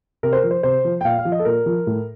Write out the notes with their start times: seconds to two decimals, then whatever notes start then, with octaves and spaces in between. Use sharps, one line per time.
0.23 C3 A#4
0.33 C5
0.37 A#4
0.44 F3
0.51 C5
0.63 C3 C5
0.85 F3
1.01 G5
1.05 A#2 F5
1.18 F5
1.25 F3
1.32 D#5
1.39 A4
1.45 A#2 A#4
1.66 F3
1.87 A2